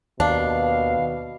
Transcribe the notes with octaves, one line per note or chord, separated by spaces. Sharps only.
D#2 B2 D4 F5